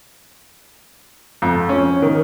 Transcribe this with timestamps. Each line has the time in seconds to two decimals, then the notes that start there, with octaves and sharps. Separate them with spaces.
1.42 F2
1.69 C#4
2.02 D#3